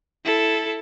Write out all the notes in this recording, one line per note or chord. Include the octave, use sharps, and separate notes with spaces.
E4 A4